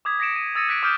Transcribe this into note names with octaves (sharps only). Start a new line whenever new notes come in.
D6 D#6 G#6 B6
D#6 A#6 B6 C#7 D7 E7
D#7
D#6 E6 A6 A#6 C#7 D#7
F#6 B6 D7
D6 D#6 F6 G6 D7